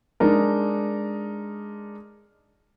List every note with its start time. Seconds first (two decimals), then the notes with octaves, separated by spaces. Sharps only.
0.20 G#3 D4 D#4 A#4